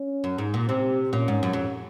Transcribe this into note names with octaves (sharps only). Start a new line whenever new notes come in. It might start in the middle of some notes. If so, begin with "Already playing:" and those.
Already playing: C#4
F#2
G#2
A#2
C3 C4
A#2 C#4
G#2
F#2
F2